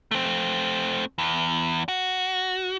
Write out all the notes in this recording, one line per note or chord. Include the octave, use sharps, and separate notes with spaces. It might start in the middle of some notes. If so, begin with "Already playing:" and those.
A3 C4
E2
F#4